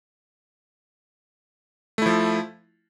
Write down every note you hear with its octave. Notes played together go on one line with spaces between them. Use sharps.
F3 A3 E4